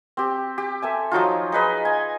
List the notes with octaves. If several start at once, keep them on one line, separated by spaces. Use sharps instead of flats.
C4 G4
G4
A4 E5 G#5
F3 F#3 D#4 F4
D#4 G#4 B4 D#5
G#5